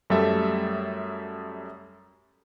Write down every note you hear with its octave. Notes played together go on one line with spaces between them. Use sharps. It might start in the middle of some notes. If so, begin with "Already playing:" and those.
F#2 G3 A3 A4 E5